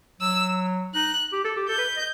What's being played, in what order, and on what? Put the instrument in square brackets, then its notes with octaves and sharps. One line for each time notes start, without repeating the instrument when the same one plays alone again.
[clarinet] F#3 [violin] E6
[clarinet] D#4 [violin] F#6
[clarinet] G4
A4
G4
[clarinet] A4 [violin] G6
[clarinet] B4
D#5